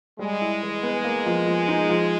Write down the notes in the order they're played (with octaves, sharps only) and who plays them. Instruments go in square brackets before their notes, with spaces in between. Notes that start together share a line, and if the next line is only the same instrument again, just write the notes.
[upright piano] G3 [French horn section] G#3
[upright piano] E4
E3
B3
A#3
F3
F3
D#4
F3